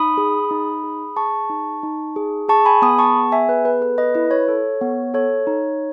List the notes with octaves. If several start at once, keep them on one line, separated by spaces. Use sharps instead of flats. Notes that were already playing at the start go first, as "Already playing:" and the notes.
Already playing: D#4 B5 D#6
G#4
D#4
G#4
G#4 A5 C#6
D#4
D#4
G#4
G#4 A5 C#6
G#5 B5
B3 B5 D#6
A5 C#6
G#4
E5 G#5
B3 B4
B4
A4 B4
B4 D#5
E4 B4
C#5
A4
B3
A4 C#5
D#4